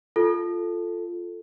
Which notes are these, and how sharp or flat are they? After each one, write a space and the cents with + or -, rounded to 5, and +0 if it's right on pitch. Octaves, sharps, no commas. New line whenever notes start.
F4 +0 A4 +0